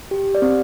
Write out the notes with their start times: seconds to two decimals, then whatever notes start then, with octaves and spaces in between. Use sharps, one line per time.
0.11 G4
0.35 D5
0.42 C4